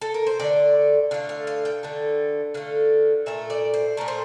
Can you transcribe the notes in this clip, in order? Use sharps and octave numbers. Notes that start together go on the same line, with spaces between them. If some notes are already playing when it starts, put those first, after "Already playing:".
A4
A#4
C5
D3 A3 D5
D3 A3 F5
F5
F5
G5
D3 A3
D3 A3 F5
A#2 A3 E5
D5
C5
A#2 A3 A#4
C5